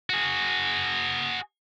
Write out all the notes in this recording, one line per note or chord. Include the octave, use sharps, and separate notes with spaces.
F#4 G#4